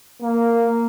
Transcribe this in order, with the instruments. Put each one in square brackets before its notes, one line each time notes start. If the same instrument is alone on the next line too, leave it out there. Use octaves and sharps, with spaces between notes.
[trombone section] A#3